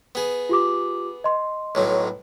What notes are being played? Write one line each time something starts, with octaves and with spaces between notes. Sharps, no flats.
B3 G#4
F4 G4 D6
D#5 C6
B1 A2 F#3